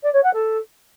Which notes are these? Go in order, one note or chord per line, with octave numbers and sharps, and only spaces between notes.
D5
C#5
F#5
A4